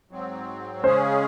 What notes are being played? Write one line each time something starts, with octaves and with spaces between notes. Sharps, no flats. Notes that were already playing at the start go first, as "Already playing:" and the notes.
G#2 F#3 C4
C#3 G#3 C#4 G#4 C5